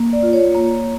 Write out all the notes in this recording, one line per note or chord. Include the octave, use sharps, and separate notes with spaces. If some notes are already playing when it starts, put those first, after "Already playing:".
Already playing: A#3
D5
F4
C#5
A#3